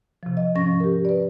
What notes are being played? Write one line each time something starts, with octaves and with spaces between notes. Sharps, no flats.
C3 F3
D#5
G#2 F3 C#4 C#6 A#6
G4 A#4
B4 D5